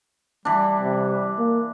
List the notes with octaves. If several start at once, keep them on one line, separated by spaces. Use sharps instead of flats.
E3 G3 D4
C3
A#3